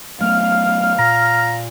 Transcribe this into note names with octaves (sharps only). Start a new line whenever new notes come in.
F#3 A3 B3 F5 F6
A#2 A#5